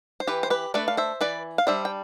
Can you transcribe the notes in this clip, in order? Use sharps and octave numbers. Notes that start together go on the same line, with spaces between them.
C5
E3 G4 B4
C5
G4 B4
A3 D4 B4 D5
F5
C5 E5
E3 B4 D5
F5
G3 D4 C5 E5
G5